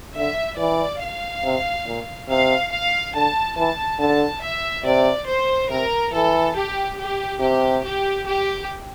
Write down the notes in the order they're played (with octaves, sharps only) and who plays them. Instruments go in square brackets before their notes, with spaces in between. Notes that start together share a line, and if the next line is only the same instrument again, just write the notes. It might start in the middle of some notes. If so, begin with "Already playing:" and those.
[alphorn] D3 [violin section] E5
[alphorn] E3 [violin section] D5
[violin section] F5
[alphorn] C3
A#2
[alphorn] C3 [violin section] F5
[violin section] F5
[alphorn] D3 [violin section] A5
[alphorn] E3 [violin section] A5
[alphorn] D3 [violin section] A5
[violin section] E5
[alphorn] C3 [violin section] D5
[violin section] C5
[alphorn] C3 [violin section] A#4
[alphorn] E3 [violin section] A4
[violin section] G4
G4
[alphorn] C3 [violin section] G4
[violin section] G4
G4